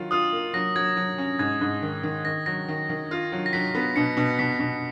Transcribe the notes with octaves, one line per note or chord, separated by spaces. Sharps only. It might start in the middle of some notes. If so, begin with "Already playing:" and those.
Already playing: D#3 F#3 F4
F4 D#6
A#3
F#3 A#6
F#3 G#6
F#3
C#4
G#2 G#6
G#2
D#3
D#3
D#3 A#6
F#3 A#6
D#3
D#3
F4
F#3
A#6
F#3 B6
B3
B2 C#7
B2
B2 B6
B2